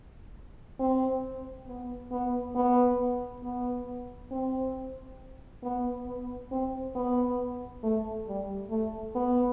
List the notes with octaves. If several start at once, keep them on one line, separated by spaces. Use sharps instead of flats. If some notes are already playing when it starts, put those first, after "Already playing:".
C4
B3
B3
B3
B3
C4
B3
B3
C4
B3
A3
G3
A3
B3